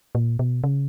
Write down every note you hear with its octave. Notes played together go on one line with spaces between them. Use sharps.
A#2
B2
C#3